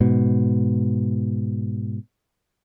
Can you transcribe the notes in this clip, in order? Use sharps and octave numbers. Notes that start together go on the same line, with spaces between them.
G#2 B2